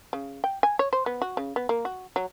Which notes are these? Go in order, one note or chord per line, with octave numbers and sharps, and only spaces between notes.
C#3
G5
G#5
C#5
C5
B3
F#4
C#3
B3
A#3
F#4
F#3